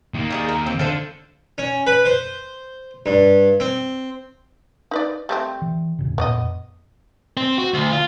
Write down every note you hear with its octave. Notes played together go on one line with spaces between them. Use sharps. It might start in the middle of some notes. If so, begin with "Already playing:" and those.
D#2 A#3
D#3 G3 G#4
A#4
C4
D3 F4 A4 C5
C#4
B4
C5
G2
C4
D#4 B4 D5
G3 A3 C4
E3
D#2 A2 C#3
F2 A#2 B3 D5 D#5
C4
F#4
D2
F4